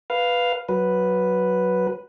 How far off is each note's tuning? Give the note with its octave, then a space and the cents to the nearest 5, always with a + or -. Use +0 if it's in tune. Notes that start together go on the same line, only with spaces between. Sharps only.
B4 +0 F5 +0
F#3 +0 B4 +0